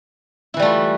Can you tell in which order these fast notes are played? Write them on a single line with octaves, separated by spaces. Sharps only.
E4 E3 G3 A3 F4